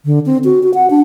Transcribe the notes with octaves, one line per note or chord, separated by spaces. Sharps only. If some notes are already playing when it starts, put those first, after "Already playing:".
D3
C4
F#4
F#4
F#5
D4